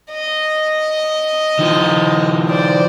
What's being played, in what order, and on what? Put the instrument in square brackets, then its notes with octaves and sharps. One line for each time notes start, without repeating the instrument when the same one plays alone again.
[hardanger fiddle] D#5
[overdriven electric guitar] D#3 F3
[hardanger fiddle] C5 D5